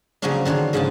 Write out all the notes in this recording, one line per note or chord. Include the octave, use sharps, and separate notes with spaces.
C#3 F3 F#3 A#3 C#4 D4
D3 D#3 D4 C#5 C6
G#2 C#3 F3 F#5 G#5 A5